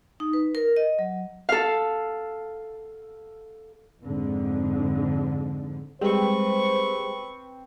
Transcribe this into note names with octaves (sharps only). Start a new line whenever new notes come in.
D#4
B4
A#4
D#5
F#3
A4 F5
F2 G#2 D3
G3 G#3 C4 B4 C5 C#6